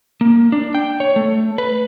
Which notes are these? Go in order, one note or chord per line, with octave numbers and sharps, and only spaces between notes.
A#3
D4
G5
C#5
A3
B4